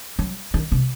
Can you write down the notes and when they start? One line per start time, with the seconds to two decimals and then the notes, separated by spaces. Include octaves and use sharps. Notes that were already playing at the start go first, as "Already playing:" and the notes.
0.19 F#3
0.54 D#3
0.72 C3